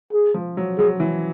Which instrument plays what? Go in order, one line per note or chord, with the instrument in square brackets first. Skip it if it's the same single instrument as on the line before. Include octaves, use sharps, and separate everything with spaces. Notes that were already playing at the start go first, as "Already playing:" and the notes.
[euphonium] G#4
[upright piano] F3
F#3
[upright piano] F#3 [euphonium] G#4
[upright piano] E3